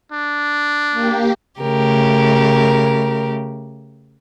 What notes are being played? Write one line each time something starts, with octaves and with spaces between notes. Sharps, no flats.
D4
A#3 G4
C#3 A3 G4 A#4